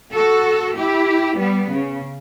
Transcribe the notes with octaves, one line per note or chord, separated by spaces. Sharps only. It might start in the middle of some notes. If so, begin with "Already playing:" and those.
F#4 A4
E4 G4
G3 B3
C#3